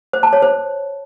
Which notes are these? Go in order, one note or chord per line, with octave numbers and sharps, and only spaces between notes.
C5
A5
C#5
C5